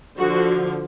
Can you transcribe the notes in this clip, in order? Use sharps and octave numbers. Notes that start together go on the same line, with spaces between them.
D3 F3 F#4